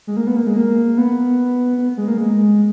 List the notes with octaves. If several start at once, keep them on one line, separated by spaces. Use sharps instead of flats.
G#3
A#3
B3
A#3
G#3
A#3
B3
B3
G#3
A#3
G#3